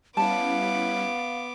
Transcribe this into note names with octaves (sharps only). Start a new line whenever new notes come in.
G3 B3 C#4 E4 F5 A5 D6